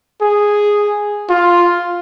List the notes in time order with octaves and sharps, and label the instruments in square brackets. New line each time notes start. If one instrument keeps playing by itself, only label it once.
[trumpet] G#4
F4